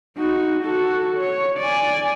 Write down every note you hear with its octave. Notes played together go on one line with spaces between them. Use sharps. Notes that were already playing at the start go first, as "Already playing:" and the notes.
D#4 F#4
F#4 A4
C#5
D5 G#5